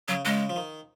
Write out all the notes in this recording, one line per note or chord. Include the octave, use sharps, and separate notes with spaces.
C#3 F#3
C#3 G#3
F3
D#3